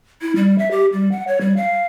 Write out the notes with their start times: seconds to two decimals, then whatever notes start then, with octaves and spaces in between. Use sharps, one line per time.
0.22 E4
0.36 G3
0.58 E5
0.71 G4
0.93 G3
1.12 F#5
1.28 C#5
1.41 G3
1.57 F5